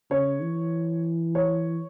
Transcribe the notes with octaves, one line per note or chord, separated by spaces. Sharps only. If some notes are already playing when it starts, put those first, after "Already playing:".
C#3 C#5
E3
C#5